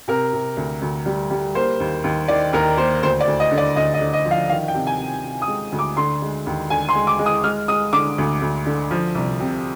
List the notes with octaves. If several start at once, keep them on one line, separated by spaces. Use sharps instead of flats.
C3 A#4
C3
D2
D2
G3
G3
A#3 C5
D#2
D#2
D#3 D5
D#2 A#4
A#3 C5
D2 C5
D5
D2
D#5
D3
D5
D2 D#5
D#5
D3
D#5
F3
F5
D#3 F5
G5
C3
G#5
C3
C3
D#6
G#3
D2
D6
D3 C6
G#3
D#2
D3 G#5
C6
G#3
D6
G#3
D#6
G#3 F6
G#3 D#6
D3 D6
D2
D2
D3
F3
C2
C3